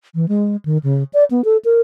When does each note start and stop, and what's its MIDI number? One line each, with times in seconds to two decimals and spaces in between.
0.15 0.28 52
0.29 0.56 56
0.65 0.78 51
0.83 1.04 49
1.14 1.24 74
1.31 1.42 59
1.45 1.57 69
1.65 1.81 70